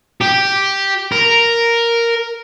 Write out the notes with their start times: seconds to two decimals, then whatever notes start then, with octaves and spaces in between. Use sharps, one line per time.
0.21 G4
1.12 A#4